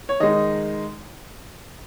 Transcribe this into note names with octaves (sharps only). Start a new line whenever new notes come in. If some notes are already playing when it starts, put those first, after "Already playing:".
C#5
D#3 G#3 D#4 D#5